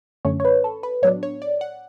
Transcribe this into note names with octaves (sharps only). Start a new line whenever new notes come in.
F#2 D3 A3 C#4 C#5
C#5
B4
A4
B4
A2 F#3 B3 D4 C#5
C#5
D5
F#5